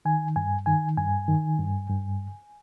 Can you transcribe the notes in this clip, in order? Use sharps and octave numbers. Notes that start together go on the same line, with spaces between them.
D#3 G#5
G2 G#5
D#3 G#5
G2 G#5
D#3
G2
G2